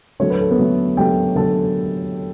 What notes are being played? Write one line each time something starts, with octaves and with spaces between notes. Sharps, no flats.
D3 F#3 A3 C#5
B4
A4
B3 B4
D3 F#3 A3
D3 F#3 A3 G4 G5
D3 F#3 A3 A4 A5